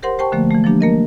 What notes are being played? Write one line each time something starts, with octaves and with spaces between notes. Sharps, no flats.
G4 A#4 C5 F#5 C6
G4 C5 G5 A5 C#6
D3 F3 A3 A#3
E3 F3 G#3 A3
F3 F#3 A#3 D4 G4
A3 A#3 A#4 D#5